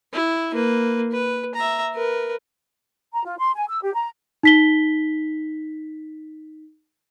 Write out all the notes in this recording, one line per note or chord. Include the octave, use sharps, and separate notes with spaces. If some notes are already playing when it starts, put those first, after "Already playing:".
E4
A#3 B4
B4
E5 A#5
A#4 B4
A#5
F4
C6
G#5
E6
G4
A#5
D#4 B6 G7